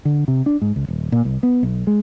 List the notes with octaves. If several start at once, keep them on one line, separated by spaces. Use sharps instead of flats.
D3
C3
D4
G#2
C#2
D#1
A#2
C2
B3
B1
G#3